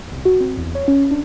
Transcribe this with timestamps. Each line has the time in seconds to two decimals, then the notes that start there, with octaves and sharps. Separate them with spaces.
0.12 C2
0.25 F#4
0.40 C4
0.57 E2
0.75 C#5
0.88 C#4
1.11 D4